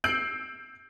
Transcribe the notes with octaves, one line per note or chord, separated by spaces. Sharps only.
E6 G6 C7 D7 F#7